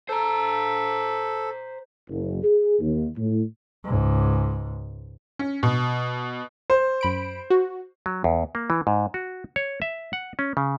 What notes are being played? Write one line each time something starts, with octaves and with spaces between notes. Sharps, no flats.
A4 C5 A#5
F#1
G#4
D#2
A2
C#2 G#2
C#4
B2
C5
F#2 B5 D7
F#4
F#3
E2
A#3
E3
G#2
F#4
C#5
E5
F#5
C#4
C#3